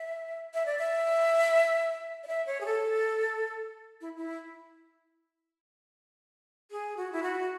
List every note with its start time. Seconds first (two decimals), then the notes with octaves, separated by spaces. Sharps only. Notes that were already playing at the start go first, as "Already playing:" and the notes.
Already playing: E5
0.54 E5
0.66 D5
0.79 E5
2.23 D5
2.27 E5
2.47 C#5
2.61 G#4
2.66 A4
4.01 E4
4.17 E4
6.71 G#4
6.97 F#4
7.12 E4
7.23 F#4